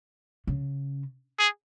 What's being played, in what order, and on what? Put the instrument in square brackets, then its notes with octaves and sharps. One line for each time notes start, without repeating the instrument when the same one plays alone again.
[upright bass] C#3
[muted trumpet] G#4